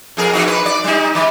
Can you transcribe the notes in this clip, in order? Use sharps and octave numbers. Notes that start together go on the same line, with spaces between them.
F2 G#4 A#4
E3 D#4 F#4
B4
D5
G3 D#4
D#3